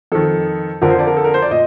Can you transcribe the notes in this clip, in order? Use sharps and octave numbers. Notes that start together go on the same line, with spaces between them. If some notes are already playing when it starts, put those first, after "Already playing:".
F2 D#3 A4
F2 D3 F3 A#4
C5
D5
A#4
A4
A#4
C5
D5
A#2 D#5